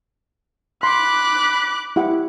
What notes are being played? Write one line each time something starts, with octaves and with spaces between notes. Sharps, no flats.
B5 C6 D6 F#6
E4 G4 F#5